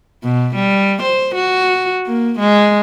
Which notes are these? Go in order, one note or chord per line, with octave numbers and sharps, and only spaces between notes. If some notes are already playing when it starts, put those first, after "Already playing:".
B2
G3
C5
F#4
A#3
G#3